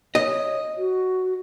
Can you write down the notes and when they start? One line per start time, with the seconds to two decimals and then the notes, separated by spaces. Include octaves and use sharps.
0.15 C#5 D#5
0.77 F#4